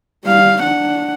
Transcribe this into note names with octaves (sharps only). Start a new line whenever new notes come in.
G3 F5
D4 F#5